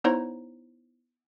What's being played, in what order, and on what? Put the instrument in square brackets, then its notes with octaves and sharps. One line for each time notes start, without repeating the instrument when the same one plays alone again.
[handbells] B3 D#4 E4 C5 C#5 A#5